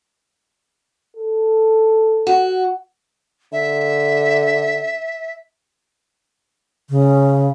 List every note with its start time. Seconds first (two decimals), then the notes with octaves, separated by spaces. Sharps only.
1.17 A4
2.27 F#4
3.53 D3 E5
6.90 C#3